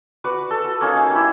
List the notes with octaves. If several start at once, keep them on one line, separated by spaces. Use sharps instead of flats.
F#4 B4 D5
A4
F#4
A#3 C#4 D#4
F5
E4 G4